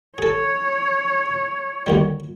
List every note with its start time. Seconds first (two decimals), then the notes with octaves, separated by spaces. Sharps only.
0.18 G#4 A4 C#5
1.86 D2 D#3 G3